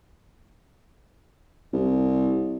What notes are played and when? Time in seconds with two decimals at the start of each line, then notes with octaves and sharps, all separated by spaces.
1.73 C2